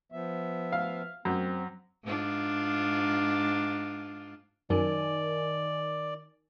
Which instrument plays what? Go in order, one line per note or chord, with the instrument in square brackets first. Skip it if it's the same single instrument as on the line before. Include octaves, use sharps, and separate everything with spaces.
[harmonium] F3 B3 E5
[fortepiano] F5
[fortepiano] F#2 [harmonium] C4
[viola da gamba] G#2 D4 F4
[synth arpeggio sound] F#2 [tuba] D#3 [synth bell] D#4 A#4 G#5 [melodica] D5